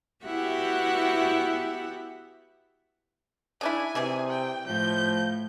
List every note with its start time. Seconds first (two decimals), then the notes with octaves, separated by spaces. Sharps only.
0.24 B3 E4 F#4 G4 E5 F#5
3.61 C#3 D4 E4 G#5
3.95 C3 E3 G3 G#4
4.29 G5
4.67 A2 F3 G6